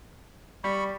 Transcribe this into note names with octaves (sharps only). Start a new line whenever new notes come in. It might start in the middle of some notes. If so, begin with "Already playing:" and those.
G3 B5 C#6